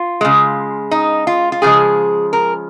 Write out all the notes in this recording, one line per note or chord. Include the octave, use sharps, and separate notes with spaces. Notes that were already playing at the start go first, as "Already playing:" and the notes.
Already playing: F4
C#3 G#3
D#4
F4
F4
C#3 F3 G#3 G#4
A#4